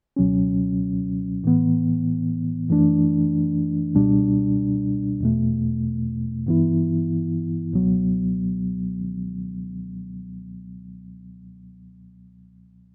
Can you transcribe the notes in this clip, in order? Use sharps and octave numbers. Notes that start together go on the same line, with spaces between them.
C#2 B2 F#3 C#4
A2 E3 B3
F#2 E3 A3 D4
C#2 B2 G3 D4
E2 B2 A3
G2 E3 B3 E4
C#2 B2 F#3 B3